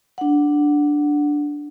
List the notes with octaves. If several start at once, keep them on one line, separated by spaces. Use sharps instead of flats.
D4 F#5